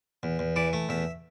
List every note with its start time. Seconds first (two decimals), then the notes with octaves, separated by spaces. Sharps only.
0.23 E2
0.39 E2
0.56 E3 D5
0.73 A3
0.89 E2 E5